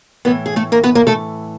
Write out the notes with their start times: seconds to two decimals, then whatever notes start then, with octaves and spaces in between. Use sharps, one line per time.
0.25 A2 E3 B3 B4
0.46 G#4
0.56 A3 A4
0.72 A#3 A#4
0.84 B3 B4
0.95 A#3 A#4
1.07 A3 A4